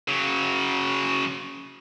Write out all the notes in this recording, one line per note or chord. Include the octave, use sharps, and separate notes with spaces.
C#3 F#3